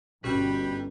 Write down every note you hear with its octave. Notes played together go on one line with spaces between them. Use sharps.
G1 B2 G3 C#4 B4 G5